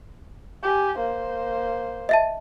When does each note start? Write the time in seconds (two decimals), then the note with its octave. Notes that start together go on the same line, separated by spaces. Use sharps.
0.64 G4 G#5
0.98 A#3 C5
2.09 D#5 E5 A5